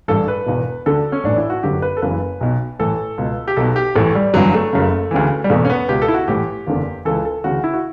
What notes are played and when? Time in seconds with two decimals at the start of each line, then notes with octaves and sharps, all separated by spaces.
0.08 A1 G2 E3 A4
0.28 B4
0.46 E1 E2 B2
0.86 D2 D3 A4
1.12 C#4
1.24 A1 A2 E3 D4
1.37 E4
1.50 F#4
1.63 G1 F#2 D3 G4
1.82 B4
1.97 A4
2.02 F#1 F#2 C#3 E3 B4
2.41 B1 B2
2.79 A1 A2 E3 A4
3.18 C#2 B2
3.48 G4
3.56 B1 B2 A4
3.76 G4
3.96 A1 A2 E3 A3
4.15 G3
4.34 G1 G2 E3 F#3
4.54 A3
4.73 F#1 F#2 C#3
5.11 D2 C#3 E3
5.44 G3
5.50 E1 E2 B2 A3
5.65 C#4
5.70 B3
5.89 C#2 B2 G4
6.02 A4
6.08 E4
6.14 F#4
6.28 A1 A2 E3 G4
6.67 F#1 E2 D3
7.05 C#2 C#3 E3 A4
7.25 A4
7.44 D2 C#3 E3 F#4
7.64 E4
7.74 F#4